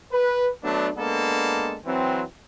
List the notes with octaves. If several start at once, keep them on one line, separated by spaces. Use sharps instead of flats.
B4
F#3 A3 B3 D4
G#3 A#3 B3 D4 A4
E3 F#3 C4